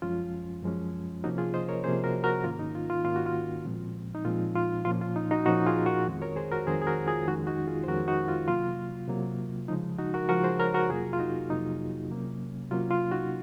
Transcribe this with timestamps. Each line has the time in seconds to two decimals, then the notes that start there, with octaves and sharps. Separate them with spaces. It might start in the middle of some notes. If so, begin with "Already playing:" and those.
0.02 F#2 F3 G#3 C#4 F4
0.63 F#2 F3 G#3 C#4
1.24 C3 F3 A#3 C#4 D#4 F#4
1.38 F4 G#4
1.54 C5 D#5
1.69 A#4 C#5
1.84 C3 F3 A#3 C#4 G#4 C5
2.04 F#4 A#4
2.24 F#4 A#4
2.44 G#2 D#3 A#3 C#4 F4
2.59 D#4
2.75 F4
2.90 F4
3.04 G#2 D#3 A#3 C#4 F4
3.16 F#4
3.26 F4
3.65 A#2 F3 G#3 C4
4.15 D#4
4.25 A#2 F3 G#3 C4 F4
4.55 F4
4.85 A#2 F3 A#3 C#4 F4
5.01 F4
5.16 D#4
5.31 D#4 F#4
5.46 A#2 F3 A#3 C#4 D#4 F#4
5.67 F4 G#4
5.86 F#4 A#4
6.07 F2 D#3 G#3 C4
6.22 A#4 C#5
6.36 G#4 C5
6.52 F#4 A#4
6.67 F2 D#3 G#3 C4 G#4 C5
6.82 G#4
6.87 F#4 A#4
7.07 F4 G#4
7.27 F2 D#3 G#3 C#4 D#4 F#4
7.47 D#4 F#4
7.67 F4 G#4
7.84 C5
7.87 F2 D#3 G#3 C#4 F#4 A#4
8.08 D#4 F#4
8.28 F4
8.48 C3 F#3 A#3 F4
9.08 C3 F#3 A#3
9.68 C#3 F3 G#3 D#4
9.98 D#4 F#4
10.14 F#4 A#4
10.29 C#3 F3 G#3 F#4 A#4
10.44 G#4 C5
10.59 A#4 C#5
10.74 F#4 A#4
10.89 F2 C3 F#3 A#3 F4 G#4
11.13 F4
11.19 D#4 F#4
11.50 F2 C3 F#3 A#3 D#4
12.10 C3 F#3 A#3 C#4
12.71 C3 F#3 A#3 C#4 F4
12.90 F4
13.11 D#4 F#4